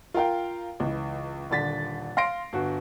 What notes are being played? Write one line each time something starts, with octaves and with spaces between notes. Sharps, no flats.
F4 A#4 F5 G5
C#2 E3
D#1 D3 A6 B6
F5 C6 A#6 C7 D7
G1 F#4